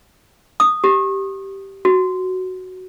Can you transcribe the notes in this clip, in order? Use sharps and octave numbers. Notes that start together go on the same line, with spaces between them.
D#6
G4
F#4